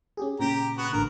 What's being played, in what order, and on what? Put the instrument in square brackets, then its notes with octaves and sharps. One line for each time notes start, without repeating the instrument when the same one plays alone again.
[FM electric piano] C#4 G4 G#4
[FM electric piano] A#2 C#3 [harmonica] G4 A#5
[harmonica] B3 F#4
[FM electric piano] A1 D3 [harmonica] A#4